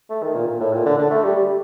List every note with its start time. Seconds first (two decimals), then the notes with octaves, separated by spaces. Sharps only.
0.10 A3
0.23 D#3
0.35 A#2
0.48 A#2
0.60 A2
0.73 A#2
0.86 D3
0.98 D3
1.11 A3
1.24 G3
1.37 G3